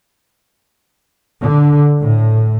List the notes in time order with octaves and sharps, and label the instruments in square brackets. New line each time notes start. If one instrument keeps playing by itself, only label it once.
[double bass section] D3
A2